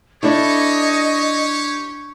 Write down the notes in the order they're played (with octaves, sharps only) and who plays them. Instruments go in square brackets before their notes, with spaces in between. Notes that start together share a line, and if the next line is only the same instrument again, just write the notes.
[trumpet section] C#4 G4 C#5 [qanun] D4 E4 A4 [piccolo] D#5 [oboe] C#6